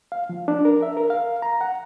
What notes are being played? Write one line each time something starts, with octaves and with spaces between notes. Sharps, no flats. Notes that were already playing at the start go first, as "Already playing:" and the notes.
F5
F3
D4
A#4
E5
A#4
F5
A#5
F#5